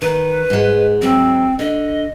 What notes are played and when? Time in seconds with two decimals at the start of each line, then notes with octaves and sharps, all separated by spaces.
0.02 D#3 B4
0.50 G#2 G#3
1.02 G#2 F#3 C4
1.59 D3 D#5